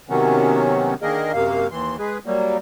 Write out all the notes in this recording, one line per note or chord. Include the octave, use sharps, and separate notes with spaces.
C3 D#3 F#3 B3 C#4
D3 D#3 A#3 G#4 A#4 D#5
F#2 C3 A#3 F5
D#2 E3 C6
G#3 G#4 B4
F#3 G3 A#3